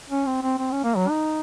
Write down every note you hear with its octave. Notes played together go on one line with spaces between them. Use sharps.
C#4
C4
C4
C4
C#4
A#3
F#3
D#4